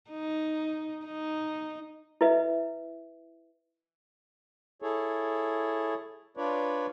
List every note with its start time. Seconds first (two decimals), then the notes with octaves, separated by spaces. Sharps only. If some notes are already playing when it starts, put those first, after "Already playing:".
0.10 D#4
1.06 D#4
2.21 E4 B4 D#5 E5
4.82 E4 G#4 A4 C#5
6.37 D4 F4 B4 C#5 D5